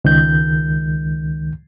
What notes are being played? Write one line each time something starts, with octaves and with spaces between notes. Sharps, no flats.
C#2 D#3 G6